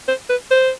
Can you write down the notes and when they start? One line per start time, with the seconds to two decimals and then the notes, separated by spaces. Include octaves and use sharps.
0.08 C5
0.29 B4
0.51 C5